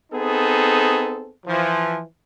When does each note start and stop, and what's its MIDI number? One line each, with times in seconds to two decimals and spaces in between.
0.12 1.30 59
0.12 1.30 60
0.12 1.30 63
0.12 1.30 68
0.12 1.30 69
1.46 2.02 52
1.46 2.02 53